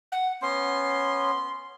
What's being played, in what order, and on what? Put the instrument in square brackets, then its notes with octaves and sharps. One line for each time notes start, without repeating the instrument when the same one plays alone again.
[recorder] F#5
[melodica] B3 C#4 [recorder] C6